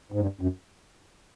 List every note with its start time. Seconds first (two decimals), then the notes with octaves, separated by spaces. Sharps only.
0.12 G#2
0.21 G2
0.41 F#2